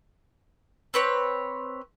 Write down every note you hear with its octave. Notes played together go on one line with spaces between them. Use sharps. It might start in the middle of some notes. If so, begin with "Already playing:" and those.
C4 B4 C#5